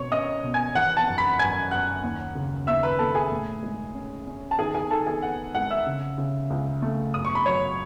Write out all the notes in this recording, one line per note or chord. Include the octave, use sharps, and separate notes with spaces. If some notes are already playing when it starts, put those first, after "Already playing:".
Already playing: B2 C#4 C#5 C#6
C#4 D#5 D#6
B2
G#5 G#6
E3 F#5 F#6
A5 A6
F#2
B5 B6
F#2 G#5 G#6
F#2 F#5 F#6
D#2
C#3
D#2 E5 E6
B4 B5
D#2 A4 A5
G#4 G#5
A2
G#3
C#4
C#4
A5
D#3 G#4 G#5
G#4 G#5
D#3 A4 A5
G#4 G#5
B3 F#5
G#3 F#5
E5 E6
C#3
C#3
C#2
A3
F#2 D#6
C#6
B5
F#3 C#5 C#6